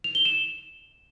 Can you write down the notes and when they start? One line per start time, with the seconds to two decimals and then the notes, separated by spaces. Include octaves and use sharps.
0.04 F7
0.15 G7
0.25 E7